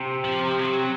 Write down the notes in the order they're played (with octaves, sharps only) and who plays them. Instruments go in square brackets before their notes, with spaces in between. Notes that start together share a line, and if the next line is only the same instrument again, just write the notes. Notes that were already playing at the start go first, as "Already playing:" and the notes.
Already playing: [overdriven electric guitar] C3
[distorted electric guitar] F3
F#3